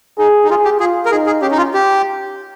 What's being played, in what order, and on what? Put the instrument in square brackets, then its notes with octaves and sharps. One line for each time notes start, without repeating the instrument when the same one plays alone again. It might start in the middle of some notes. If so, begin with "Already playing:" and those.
[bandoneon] D#4 [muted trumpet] G#4
[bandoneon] D#4
[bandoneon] F4 [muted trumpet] G#4
[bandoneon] G4
[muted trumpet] F4 [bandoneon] G#4
[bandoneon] A#4
[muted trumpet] D#4 [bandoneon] G#4
[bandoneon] G#4
[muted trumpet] C#4 [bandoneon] G4
[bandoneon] D#4
F4
G4